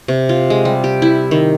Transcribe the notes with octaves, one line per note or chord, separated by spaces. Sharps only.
C3
F4
G#3
G3
G4
E4
D#3